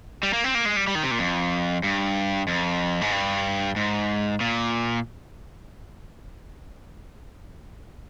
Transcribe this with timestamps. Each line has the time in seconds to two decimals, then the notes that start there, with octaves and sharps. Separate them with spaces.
0.23 G3
0.33 A#3
0.44 C4
0.55 A#3
0.65 G#3
0.76 G3
0.87 G3
0.95 D#3
1.03 C3
1.11 A#2
1.19 F2
1.83 G2
2.48 F2
3.01 G#2
3.12 G2
3.76 G#2
4.41 A#2